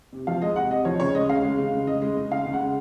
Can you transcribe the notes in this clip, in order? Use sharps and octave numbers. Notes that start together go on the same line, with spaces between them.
C3
F3 F5
G#3 D#5
C3 F#5
C3 D#5
F3 C#5
C#3 C#5
G#3 D#5
C#3 F5
G#3
C#3
G#3
C#3 D#5
G#3
C#3
G#3 F5
C#3
F#5
G#3